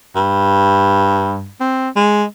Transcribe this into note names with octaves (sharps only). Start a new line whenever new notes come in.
G2
C4
G#3